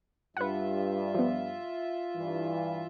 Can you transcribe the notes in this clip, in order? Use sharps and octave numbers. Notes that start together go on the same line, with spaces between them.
G2 F4 B4 E5 F#5
F3 B3
G2 E3